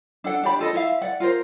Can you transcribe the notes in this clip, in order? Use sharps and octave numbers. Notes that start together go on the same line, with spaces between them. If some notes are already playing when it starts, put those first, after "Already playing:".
D4 A4 F#5
D4 G4 D5 B5
F4 A4 D#5
E4 E5 F5
D5 F#5
F4 A#4 C5